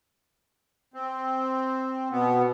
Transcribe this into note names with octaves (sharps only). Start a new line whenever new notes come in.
C4
B2 B3